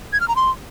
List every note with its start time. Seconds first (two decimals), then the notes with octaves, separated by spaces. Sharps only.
0.13 G#6
0.21 F6
0.28 A#5
0.36 C6